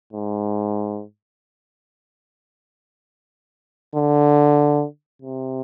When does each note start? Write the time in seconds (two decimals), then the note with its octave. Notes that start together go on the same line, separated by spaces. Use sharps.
0.13 G#2
3.95 D3
5.22 C3